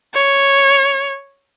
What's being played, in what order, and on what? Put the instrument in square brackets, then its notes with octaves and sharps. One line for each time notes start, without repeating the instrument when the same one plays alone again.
[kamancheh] C#5